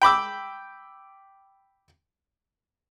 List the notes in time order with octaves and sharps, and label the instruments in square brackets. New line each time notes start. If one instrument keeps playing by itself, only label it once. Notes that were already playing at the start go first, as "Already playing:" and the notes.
[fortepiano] G5 B5 D6 E6